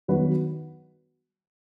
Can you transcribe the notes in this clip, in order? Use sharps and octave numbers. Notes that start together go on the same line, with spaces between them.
D#3 F#3 B3 F#4 B4